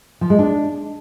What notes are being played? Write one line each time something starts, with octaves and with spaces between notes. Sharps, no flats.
F3
G#3
D4